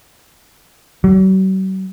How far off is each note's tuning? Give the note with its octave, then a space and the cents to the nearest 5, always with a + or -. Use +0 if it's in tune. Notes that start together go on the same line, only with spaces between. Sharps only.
F#3 +45